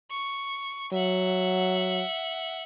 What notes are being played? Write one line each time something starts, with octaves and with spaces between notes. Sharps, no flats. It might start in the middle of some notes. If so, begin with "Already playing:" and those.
C#6
F#3 E5 F#5